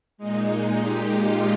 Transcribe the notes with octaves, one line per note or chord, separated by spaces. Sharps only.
A#2 G#3 D#4
D#4
G4
F4